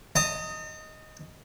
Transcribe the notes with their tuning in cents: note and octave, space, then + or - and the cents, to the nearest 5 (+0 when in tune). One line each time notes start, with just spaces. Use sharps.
D#5 +0 A#5 -45